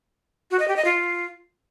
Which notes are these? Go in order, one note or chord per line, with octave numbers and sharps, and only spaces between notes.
F#4
D#5
G4
D#5
F4